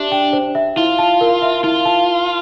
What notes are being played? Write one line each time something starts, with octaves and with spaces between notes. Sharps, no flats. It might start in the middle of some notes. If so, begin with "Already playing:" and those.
Already playing: D4 G4 E5
G5
C5
E5
E4 F4
A5
A#4
E5
E4 F4
A5